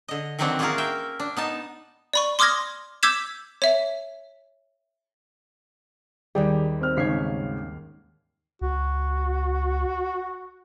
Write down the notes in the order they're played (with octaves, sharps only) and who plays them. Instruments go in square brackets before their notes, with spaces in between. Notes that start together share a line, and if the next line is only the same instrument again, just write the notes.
[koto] D3 D#5
D#3 E3 F#3 C4 D4 F#4
A#3 C#4 F4 F#4 G#4 A#4
E5 G5
D4
B3 D#4 A5
[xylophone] D5 B5 C#6
C6 D6 D#6 F6 G#6 A#6
D6 E6 G6 G#6 B6 E7
C#5 E5
[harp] D#2 D#3 G3 [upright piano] G4 G#4 D5
[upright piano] C4 F6
[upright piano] G#1 C#3 C7 [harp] C#5 B6
[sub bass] C#2 [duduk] F#4